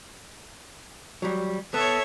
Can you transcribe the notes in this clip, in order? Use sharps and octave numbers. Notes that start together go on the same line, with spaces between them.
F#3 G3
B3 A4 C#5 E5